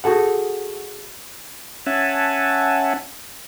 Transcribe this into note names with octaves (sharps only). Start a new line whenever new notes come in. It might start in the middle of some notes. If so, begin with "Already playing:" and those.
F#4 G#4 A4 F#5
C#4 E5 F#5 G#5 A5